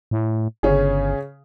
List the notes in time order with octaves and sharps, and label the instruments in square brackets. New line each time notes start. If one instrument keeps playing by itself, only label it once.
[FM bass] A2
[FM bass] G1 [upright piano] C#3 C#4 G#4